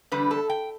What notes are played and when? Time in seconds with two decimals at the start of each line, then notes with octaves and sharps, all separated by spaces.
0.12 E2 D3 G3 D4 B4
0.31 A4
0.50 G5